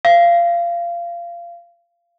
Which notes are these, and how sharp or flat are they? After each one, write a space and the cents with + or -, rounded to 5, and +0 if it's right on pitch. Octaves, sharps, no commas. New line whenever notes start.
F5 -20